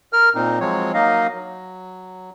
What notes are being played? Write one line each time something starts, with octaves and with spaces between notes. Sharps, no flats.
A#4 F6
A#2 C4 D#4
F3 F#3 G#3 C4 C#5
F#3 A#3 D#4 D#5 F5
F#3